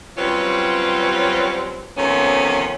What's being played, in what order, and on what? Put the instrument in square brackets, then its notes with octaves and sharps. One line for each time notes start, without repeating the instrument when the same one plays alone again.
[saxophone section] F#3 G3 C4 C#4 F4 B4
C3 D#3 F3 A3 B3 C#4